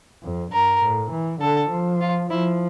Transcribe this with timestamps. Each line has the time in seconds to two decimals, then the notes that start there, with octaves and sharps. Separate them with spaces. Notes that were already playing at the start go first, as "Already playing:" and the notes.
0.23 F2
0.52 G2 A#4
0.82 A2
1.11 E3
1.41 D3 A4
1.70 F3
2.01 F4
2.30 F3 E4